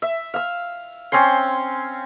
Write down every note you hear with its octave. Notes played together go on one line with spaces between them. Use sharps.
E5
F5 E6
C4 C#4 G#5 C6